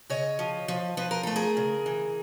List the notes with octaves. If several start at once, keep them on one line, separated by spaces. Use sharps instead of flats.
C#3 C#5 D#5
F3
F3
F3 B4
A#4
A3 A4
G#4 A#4
C#3
E3